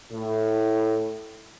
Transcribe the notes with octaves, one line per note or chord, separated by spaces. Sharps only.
A2